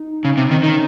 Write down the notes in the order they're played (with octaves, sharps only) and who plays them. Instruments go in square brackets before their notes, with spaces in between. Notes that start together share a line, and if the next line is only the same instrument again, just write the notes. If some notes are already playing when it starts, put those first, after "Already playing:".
Already playing: [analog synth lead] D#4
[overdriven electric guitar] C#3
C3
D#3
[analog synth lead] C4
[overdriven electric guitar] D#3 [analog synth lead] C#4